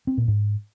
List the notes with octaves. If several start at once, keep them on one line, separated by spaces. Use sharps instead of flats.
C4
A#2
G#2